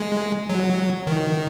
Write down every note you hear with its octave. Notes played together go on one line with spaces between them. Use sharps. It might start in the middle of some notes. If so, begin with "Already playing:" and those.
Already playing: G#3
F#3
D#3